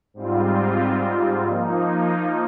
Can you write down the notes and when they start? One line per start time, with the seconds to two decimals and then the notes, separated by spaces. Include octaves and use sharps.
0.14 G#2 G3 C4 F4
1.44 F3 A#3 D#4